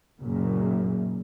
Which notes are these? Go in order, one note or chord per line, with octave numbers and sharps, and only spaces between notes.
F#1 F#2 A#2 C#3